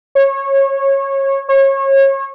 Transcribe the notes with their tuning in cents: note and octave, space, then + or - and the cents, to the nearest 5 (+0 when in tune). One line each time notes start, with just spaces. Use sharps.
C#5 -20
C#5 -30